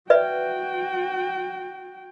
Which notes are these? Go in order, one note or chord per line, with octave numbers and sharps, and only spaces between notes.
F#4 B4 D5 E5 G5